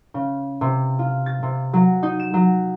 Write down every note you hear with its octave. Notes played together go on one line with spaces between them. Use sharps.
C#3
C3
F4
A6
C3
F#3
D#4
E7
F#3